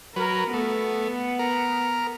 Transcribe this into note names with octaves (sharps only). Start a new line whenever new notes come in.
F#3 A#4 B4
A3 B3
A#4